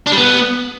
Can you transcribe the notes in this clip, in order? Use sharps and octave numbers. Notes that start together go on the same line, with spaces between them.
D4
G3
B3